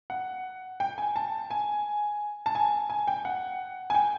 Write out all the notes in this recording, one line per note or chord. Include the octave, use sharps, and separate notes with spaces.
F#5
G5
G#5
A5
G#5
A5
G#5
G#5
G5
F#5
G#5
G5